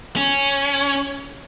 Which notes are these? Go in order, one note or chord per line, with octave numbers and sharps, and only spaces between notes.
C#4